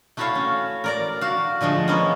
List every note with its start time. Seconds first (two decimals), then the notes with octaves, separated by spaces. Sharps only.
0.17 A3 E4 F#4 A4 C#5 F5
0.35 C#4
0.84 A#4 D5 A#5
1.21 F#4 F5
1.61 D3 F3 G#3 A3
1.88 G#3 A#3 B3 C#4